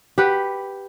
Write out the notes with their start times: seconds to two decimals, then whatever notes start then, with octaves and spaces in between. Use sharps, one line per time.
0.18 G4 B4 F#5